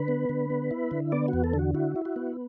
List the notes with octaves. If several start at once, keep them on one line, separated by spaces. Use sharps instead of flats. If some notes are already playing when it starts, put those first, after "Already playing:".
Already playing: D3 B4
B3
D3
B3
E4
D3
B3 D5
F#4
E2
A4
D3
F#4
E4 F#4
E4
F#4
B3